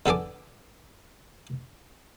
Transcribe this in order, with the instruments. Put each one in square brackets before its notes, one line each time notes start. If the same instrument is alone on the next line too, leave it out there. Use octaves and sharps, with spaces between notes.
[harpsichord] D3 B3 A4 G#5 D6